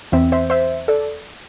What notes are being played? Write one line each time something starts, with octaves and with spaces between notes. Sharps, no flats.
E2 E3 C4 E5
C5 E5
C5 E5
A4 D5